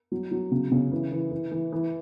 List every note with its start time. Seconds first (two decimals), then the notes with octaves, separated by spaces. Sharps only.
0.12 F#3
0.32 F#3
0.51 C#3
0.72 C#3
0.92 E3
1.12 E3
1.31 E3
1.52 E3
1.72 E3